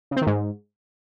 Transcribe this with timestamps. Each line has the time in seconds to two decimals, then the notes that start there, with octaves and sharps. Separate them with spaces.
0.11 C#3
0.16 C4
0.22 D#3
0.27 G#2